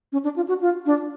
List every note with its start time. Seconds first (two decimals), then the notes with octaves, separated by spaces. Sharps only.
0.12 C#4
0.24 D4
0.36 F4
0.49 F#4
0.62 F4
0.86 D4